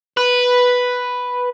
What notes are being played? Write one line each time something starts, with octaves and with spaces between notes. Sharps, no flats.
B4